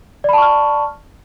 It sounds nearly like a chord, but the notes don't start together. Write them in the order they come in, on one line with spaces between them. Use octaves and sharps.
D5 B5 A5 C#6 F6